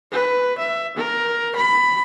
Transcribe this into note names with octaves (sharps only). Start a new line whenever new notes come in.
B4
E5
A#4
B5